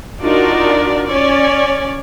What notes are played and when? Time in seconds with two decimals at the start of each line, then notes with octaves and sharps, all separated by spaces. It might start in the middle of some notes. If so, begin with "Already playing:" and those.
0.22 D4 D#4 F4 F#4 A#4 D5
1.10 C#4 C#5 D5